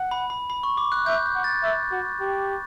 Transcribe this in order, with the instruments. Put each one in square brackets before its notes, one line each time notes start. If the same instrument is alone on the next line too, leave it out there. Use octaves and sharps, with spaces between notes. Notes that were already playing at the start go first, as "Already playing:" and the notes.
Already playing: [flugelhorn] F#5
[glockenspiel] B5
B5
B5
C#6
D6
F#6
[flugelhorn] E5 [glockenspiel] G6
[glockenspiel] G6
[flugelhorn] F#5
[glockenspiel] A6
[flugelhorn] E5
F#4
G4